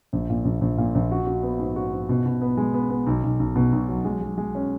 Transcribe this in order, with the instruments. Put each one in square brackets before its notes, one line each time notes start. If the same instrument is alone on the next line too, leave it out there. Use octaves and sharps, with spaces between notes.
[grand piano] A#1
A#2
A#1
A#1
A#2
A#1
F#4
F#4
B3
G#2
F#4
G#2
B2
B2
B3
G#3
B3
B3
B1
B1
B1
B2
B1
F#3
G#3
G#3
G#3
C#4